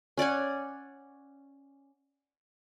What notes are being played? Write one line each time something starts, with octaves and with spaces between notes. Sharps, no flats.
C#4 D5 F#5 G#5